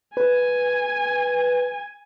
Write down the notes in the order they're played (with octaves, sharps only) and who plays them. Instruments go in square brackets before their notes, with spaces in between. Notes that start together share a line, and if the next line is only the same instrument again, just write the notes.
[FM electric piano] B4 [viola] G#5